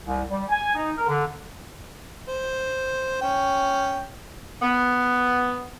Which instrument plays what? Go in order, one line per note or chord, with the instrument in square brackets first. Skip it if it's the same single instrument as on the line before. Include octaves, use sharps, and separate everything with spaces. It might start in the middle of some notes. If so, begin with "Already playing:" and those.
[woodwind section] C2
G3
G#5
D#4
A#4
D3
[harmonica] C5
C#4 G5
[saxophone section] B3